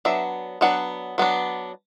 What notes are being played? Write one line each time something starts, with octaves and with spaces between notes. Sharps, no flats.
F#3 B3 D4 E5
F#3 B3 D4 F#5
F#3 B3 D4